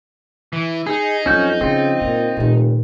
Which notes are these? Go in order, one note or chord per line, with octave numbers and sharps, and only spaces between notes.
E3
D#4 G#4
F2 F#3 C#4 D4 F#4 G6
C#3 F3 C4 F4
A#2 D3
F1 A#2 D#3